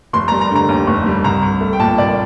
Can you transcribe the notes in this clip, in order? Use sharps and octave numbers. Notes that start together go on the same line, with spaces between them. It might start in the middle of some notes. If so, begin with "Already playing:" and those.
F1 C6
G3 A#5
A#5
D3 A#5
D#2
F1
G3
C2 A#5
C2
A3
G5
A#2 A5
C2 D5